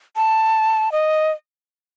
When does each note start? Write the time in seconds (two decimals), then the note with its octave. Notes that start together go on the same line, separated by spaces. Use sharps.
0.16 A5
0.92 D#5